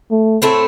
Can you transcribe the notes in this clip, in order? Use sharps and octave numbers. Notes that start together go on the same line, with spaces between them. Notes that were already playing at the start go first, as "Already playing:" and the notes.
A3
A2 A3 C4